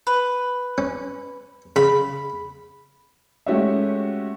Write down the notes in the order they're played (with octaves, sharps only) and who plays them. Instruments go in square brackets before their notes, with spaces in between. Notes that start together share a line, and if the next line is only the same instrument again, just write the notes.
[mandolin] B4
[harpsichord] C#4
[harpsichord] C#3 [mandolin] B5
[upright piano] G#3 A3 C#4 F#4 G4 E5